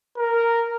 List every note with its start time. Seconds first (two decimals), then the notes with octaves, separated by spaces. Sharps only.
0.18 A#4